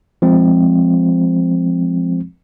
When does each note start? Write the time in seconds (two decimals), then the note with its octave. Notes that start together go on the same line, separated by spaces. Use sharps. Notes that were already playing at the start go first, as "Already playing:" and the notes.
0.22 F3 G#3 C4